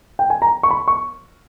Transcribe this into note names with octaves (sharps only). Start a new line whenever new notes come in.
G5
G#5
A#5
C#6
B5
C#6